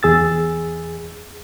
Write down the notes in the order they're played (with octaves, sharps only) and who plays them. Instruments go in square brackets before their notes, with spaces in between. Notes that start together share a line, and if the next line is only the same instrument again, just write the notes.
[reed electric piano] E2 G#4 E6 A6